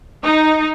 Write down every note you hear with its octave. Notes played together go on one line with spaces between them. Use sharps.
D#4